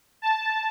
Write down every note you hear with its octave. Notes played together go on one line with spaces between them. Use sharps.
A5